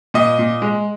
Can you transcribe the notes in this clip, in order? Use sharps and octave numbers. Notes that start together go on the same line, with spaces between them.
A#2 D#5
A#2
G#3